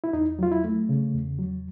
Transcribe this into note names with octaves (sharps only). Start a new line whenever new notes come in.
E4
E2 D#4
F#3 F4
E4
A3
C#3
E2
F#3